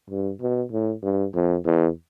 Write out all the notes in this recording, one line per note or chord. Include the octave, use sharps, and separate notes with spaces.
G2
B2
A2
G2
F2
E2